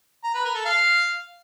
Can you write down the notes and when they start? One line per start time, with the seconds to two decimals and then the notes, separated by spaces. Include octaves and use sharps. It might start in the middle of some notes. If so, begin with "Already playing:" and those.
0.24 A#5
0.34 B4
0.45 A#4
0.55 A4
0.65 F5